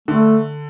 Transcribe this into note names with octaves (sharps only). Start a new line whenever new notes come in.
D3 A3